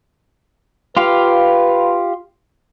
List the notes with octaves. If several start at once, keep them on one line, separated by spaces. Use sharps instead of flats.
F4 G4 B4 F5